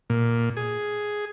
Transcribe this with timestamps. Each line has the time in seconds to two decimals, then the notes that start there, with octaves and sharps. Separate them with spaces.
0.10 A#2
0.57 G#4